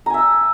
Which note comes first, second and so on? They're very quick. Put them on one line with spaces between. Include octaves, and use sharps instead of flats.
A#5 G#5 E5 E6